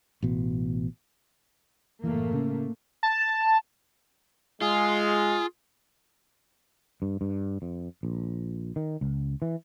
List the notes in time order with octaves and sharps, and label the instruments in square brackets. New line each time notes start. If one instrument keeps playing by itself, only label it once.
[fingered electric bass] A1 B2
[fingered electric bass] F#1 E3 [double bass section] A2 A3 A#3
[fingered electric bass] C#3 C#4
[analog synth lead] A5
[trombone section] G#3 [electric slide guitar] F4 [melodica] G#4
[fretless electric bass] G2
G2
F2
A#1
D#3
C#2
E3